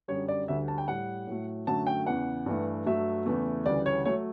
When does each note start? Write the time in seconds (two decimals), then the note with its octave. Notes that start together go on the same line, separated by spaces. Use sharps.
0.08 F#2 D3 G3 C#5
0.28 D5
0.48 D2 D3 G3 E5
0.68 A5
0.78 G5
0.87 A2 G3 F#5
1.27 A2 F#3 A3
1.67 F#2 D3 F#3 A3 A5
1.87 G5
2.07 E2 C#3 E3 F#5
2.46 G2 E3 A3
2.86 G2 F#3 A3 E5
3.26 E2 C#3 E3 A3
3.66 D2 C#3 E3 G3 D5
3.86 C#5
4.05 F#3 A3 C#5